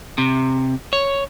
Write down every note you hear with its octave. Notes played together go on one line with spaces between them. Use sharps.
C3
C#5